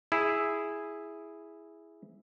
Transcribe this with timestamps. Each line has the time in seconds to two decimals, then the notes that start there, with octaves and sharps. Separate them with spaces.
0.12 E4 G#4